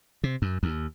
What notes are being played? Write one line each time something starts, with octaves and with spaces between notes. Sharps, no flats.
C3
F#2
D#2